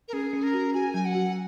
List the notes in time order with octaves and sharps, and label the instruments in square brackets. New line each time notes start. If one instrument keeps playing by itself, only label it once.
[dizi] A#4
[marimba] C#4 [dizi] G#4
[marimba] C#4
[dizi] A#4
[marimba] F#4
[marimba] F#4 [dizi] G#5
[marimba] F#3 [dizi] G#5
[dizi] F#5
[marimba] F#4